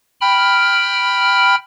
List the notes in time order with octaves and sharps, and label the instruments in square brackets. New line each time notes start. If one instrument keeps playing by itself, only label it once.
[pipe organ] G5 B5 F6